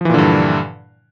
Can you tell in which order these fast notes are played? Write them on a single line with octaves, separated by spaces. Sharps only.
F3 E3 A#2 D3 G2